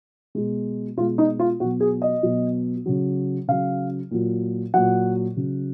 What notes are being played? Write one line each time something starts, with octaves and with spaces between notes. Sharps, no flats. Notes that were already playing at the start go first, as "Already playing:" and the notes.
B2 G#3
B2 G#3 F4
D#4
F4
B2 F#3 F#4
G#4
D#5
B2 F#3
C#3 F#3
C#3 F#3 F5
A#2 F#3
A#2 F#3 F#5
C#3 F#3